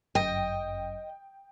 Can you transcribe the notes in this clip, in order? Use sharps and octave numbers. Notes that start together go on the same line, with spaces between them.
G1 F#2 D#5 G5